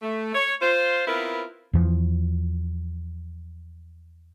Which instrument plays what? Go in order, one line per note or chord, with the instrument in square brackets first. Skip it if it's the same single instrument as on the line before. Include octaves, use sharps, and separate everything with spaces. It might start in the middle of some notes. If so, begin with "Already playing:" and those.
[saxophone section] A3
C#5
F4 C5
B3 C4 E4 F4 A#4 B4
[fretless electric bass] E2 E3 F3